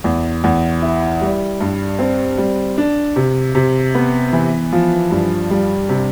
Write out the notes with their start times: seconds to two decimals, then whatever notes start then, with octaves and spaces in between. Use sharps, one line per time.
0.04 E2
0.44 E2
0.82 E4
1.21 G3
1.60 G2
1.99 C4
2.38 G3
2.78 D4
3.16 C3
3.55 C3
3.95 B3
4.33 E3
4.73 F3
5.11 G2
5.51 G3
5.89 C3